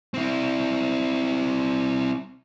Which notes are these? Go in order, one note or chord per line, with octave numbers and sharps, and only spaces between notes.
C4 E4